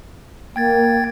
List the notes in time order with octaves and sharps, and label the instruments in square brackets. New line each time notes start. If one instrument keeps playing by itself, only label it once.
[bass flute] A#3 [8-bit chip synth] G5 G#6 A6